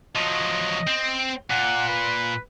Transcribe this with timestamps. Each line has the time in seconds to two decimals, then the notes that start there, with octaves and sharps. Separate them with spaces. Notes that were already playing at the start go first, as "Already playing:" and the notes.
0.16 F3 F#3 D#5
0.87 C4
1.50 A#2 F#5
1.88 B4